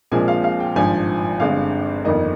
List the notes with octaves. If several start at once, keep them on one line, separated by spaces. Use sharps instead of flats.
A#1 A#2 F3 G#3 C4 G#5
F5
F5
G5
G#1 G2 F3 G#5
G1 G2 D3 G#3 C4 F5
G1 F2 D#3 A#3 D#5